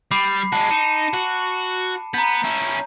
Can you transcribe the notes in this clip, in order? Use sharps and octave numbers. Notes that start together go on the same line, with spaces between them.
G3 B5 D6 C7
G#3 F#4 A5
D#4 C#7 D#7 E7
F#4
B3 A#5 G6
C#4 E4